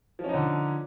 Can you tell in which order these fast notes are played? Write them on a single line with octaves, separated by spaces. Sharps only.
F3 C#4 D#4 D3